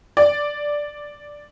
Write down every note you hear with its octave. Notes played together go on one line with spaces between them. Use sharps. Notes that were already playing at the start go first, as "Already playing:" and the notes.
D5